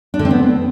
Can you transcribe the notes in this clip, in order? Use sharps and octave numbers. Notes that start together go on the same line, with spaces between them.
D4
D3
C4
B3